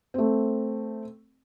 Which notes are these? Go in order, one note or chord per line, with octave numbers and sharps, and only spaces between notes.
A3 C4